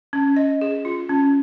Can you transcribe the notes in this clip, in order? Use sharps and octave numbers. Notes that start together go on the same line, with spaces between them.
C#4
D#5
G#4
F4
C#4